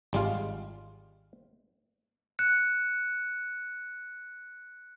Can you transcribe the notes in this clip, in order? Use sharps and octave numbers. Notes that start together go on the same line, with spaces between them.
G#1 G3 G#3 F4 F5
F#6 C#7 E7